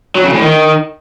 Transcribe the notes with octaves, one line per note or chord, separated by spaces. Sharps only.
F#3
C#3
A2
D#3